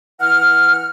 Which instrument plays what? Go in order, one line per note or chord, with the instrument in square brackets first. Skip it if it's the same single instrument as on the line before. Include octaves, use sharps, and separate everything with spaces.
[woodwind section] E3 F#5 F6